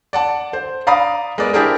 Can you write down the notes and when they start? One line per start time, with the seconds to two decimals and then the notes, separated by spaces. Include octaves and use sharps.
0.13 D5 F#5 A5
0.53 C5
0.87 D5 F5 A#5 B5 D#6
1.38 G#3 B3 A#4 D5
1.53 D4 E4 G4 G#4 A#4 C5